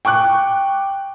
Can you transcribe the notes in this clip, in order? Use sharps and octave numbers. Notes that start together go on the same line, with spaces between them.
G5 C#6 D6 F#6